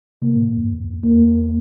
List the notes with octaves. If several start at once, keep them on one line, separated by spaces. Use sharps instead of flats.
C3 A#3
A2
A2
F2
G2
F2
E2
F2
E2 A#3